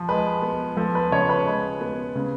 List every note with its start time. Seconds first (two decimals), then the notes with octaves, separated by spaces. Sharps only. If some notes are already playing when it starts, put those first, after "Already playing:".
Already playing: F3
0.09 G#3 B4
0.42 B3
0.77 F3 A4
0.95 B4
1.11 C#3 C#5
1.29 B4
1.46 G#3
1.81 B3
2.15 C#3